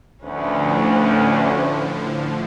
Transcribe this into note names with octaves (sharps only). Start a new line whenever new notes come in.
D2 A2 D3 F3 C#4 B4